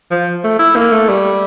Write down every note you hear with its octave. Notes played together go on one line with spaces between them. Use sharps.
F3
A3
E4
A#3
A3
G3